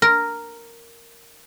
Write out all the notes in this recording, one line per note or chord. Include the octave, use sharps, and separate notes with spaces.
A#4